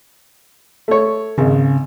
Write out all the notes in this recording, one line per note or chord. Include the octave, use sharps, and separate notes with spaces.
A3 C#5
G#1 C#3